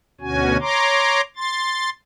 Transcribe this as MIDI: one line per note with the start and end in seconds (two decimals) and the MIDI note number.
0.21 0.57 38
0.21 0.57 47
0.21 0.57 61
0.21 0.57 66
0.21 0.57 80
0.61 1.21 73
0.61 1.21 82
0.61 1.21 84
0.61 1.21 86
1.36 1.90 84
1.36 1.90 93